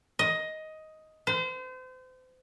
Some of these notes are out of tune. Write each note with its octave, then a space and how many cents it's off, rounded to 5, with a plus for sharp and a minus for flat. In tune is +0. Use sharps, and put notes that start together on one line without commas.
D#5 +10
C5 -35